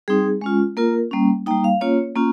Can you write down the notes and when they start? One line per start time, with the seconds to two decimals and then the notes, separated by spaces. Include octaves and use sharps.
0.08 G3 C4 D#4 G#4
0.41 G#3 C#4 F4
0.77 A#3 F4 A#4
1.11 G3 A#3 C#4
1.47 G3 A#3 D#4 G5
1.64 F5
1.81 A#3 C#4 F4 C#5
2.16 A#3 C#4 F4